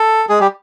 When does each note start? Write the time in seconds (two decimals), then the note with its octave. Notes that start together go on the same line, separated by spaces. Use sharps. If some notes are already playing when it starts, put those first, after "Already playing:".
Already playing: A4
0.29 G#3 G#4
0.40 G3 G4